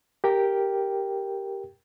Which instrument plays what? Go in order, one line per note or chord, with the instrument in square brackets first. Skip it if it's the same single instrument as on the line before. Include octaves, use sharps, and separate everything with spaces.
[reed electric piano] G4 A#4 G5